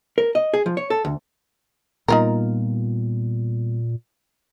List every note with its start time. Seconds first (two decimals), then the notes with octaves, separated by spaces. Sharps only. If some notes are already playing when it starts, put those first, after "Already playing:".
0.18 A#4
0.35 D#5
0.54 G#4
0.66 F3
0.77 C#5
0.90 A4
1.05 D2
2.08 A#2 G3 A#3 B3 D#4 F4 A#4